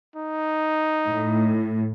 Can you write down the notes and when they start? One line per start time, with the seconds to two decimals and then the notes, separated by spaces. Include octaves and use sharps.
0.16 D#4
1.11 A2